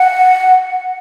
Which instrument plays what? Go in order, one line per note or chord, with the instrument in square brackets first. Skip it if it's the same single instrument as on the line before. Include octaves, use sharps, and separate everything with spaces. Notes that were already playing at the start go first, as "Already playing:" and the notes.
Already playing: [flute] F#5